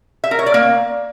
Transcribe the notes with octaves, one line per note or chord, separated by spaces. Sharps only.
E5
A#4
C#5
D5
A#3